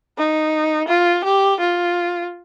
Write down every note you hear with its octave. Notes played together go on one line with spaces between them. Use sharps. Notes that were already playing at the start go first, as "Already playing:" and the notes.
D#4
F4
G4
F4